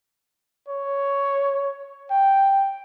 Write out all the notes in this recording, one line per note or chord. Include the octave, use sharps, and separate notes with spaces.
C#5
G5